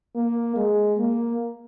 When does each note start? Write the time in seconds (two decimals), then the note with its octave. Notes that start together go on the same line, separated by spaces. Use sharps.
0.16 A#3
0.56 G#3
0.99 A#3